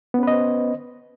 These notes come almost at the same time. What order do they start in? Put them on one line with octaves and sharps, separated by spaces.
B3 C#4 B4 D#5 C5